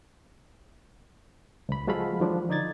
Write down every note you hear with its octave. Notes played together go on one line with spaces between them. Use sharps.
C#2 B5
F3 G#3 F#4 A4 F5 B5
D#3 F3 D4
D3 D#4 D5 G#6 A6